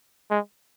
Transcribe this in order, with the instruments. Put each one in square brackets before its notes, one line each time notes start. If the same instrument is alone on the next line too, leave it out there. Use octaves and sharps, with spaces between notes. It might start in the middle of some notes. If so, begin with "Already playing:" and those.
[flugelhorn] G#3